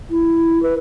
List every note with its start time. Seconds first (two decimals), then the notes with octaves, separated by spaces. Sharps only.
0.10 E4
0.62 B4